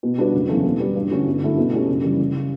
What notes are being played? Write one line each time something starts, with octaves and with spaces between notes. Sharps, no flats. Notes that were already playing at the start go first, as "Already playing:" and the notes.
B2
G3 D4 F#4 B4
F#1
E2 C#3 F#3 A3
B2
G3 B3
G2
D3 A3 C#4 F#4
G1
F#2 D3 A3 E4
B2
A3 C#4 G4
F#1
F#2 E3 G3
F#1
C#3